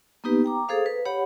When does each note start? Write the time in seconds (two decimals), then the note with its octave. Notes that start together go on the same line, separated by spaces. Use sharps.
0.24 A#3 B3 D#4 G4 B4
0.44 G5 A#5 D6
0.68 G#4 A4 C5 F5 D#6
0.86 B4
1.05 G4 C#5 F#5 B5